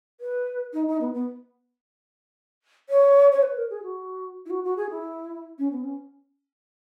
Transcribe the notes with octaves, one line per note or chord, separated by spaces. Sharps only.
B4
D#4
D#4
B3
B3
C#5
C#5
B4
A#4
G#4
F#4
E4
F#4
F#4
G#4
E4
C#4
B3
C#4